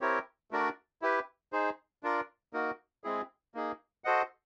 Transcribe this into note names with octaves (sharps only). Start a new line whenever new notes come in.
C4 E4 G4 A#4 C#5
A3 D4 F#4 A#4 D5
E4 G4 B4
D#4 G#4 C5
D4 F4 A#4 D5
A#3 D#4 F#4 A#4
G#3 C4 E4 G#4
A#3 D#4 G#4
F#4 A4 C5 D#5 F#5